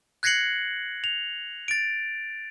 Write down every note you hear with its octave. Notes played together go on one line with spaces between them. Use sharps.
F#6 G#6 A#6 C7 C#7 F#7
F7
A6 D7